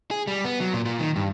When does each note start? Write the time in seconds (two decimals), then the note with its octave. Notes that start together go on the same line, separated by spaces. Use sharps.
0.11 G#4
0.27 G3
0.45 B3
0.60 F#3
0.73 A#2
0.85 A#2
0.99 D#3
1.16 G2